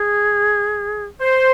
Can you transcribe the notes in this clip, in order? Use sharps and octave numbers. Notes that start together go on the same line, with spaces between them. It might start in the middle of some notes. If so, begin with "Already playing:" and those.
Already playing: G#4
C5